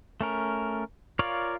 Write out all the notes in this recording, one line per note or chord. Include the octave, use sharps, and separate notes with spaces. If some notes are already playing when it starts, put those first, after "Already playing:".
A3 C#4 A#4
F4 A#4 C#5 D5 F5